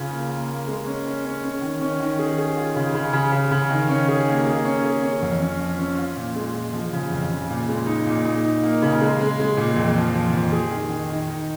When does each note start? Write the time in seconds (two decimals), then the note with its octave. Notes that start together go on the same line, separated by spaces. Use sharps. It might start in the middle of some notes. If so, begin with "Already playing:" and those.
Already playing: C#3 F4
0.10 A#3
0.29 A#3
0.48 A#3
0.67 G#3
0.86 C#4
1.06 C#4
1.24 C#4
1.44 C#4
1.61 D#3
1.81 C#4
2.00 D#3
2.19 G#4
2.38 G#4
2.57 F4
2.76 C#3
2.94 C#3
3.13 C#3
3.32 C#3
3.51 C#3
3.70 D#3
3.89 C#4
4.08 G#4
4.28 A#3
4.46 G#4
4.65 C#4
4.84 G#4
5.03 C#4
5.22 F2
5.41 C#4
5.59 F3
5.78 C#4
5.98 F4
6.17 A#2
6.36 G#3
6.54 A#2
6.73 F3
6.93 C#3
7.11 F2
7.31 C#3
7.50 A#2
7.69 G#3
7.87 D#4
8.06 A#2
8.25 D#4
8.45 D#4
8.63 A#3
8.82 C#3
9.01 G#3
9.20 G#3
9.39 G#3
9.57 A#2
9.76 F2
9.96 F3
10.14 F3
10.33 F2
10.52 G#4
10.71 D#3
10.90 D#3
11.10 D#3
11.28 D#4